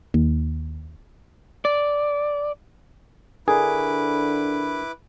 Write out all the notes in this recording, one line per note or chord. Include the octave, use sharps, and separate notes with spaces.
D#2
D5
D3 D4 E4 G#4 A#4 B4 D6